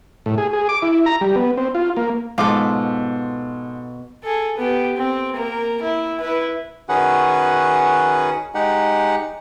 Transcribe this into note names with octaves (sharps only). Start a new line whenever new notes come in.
A2
G#4
G#4
D6
E4
A#5
G3
B3
C4
F4
A#3
G#2 B2 F4 A4 D6
G#4 A4
B3 G4
C4
A#3 A#4
E4
E4 B4
D#3 C#4 F#4 G#4 B4 F#5
G#3 D#4 G4 F#5